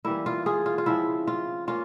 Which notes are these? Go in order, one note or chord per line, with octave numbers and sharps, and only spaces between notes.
E3 G3 A#3 E4
F4
F4 G#4
F4
F4
C#3 F3 G#3 C4 E4
F4
A#3 C#4 F4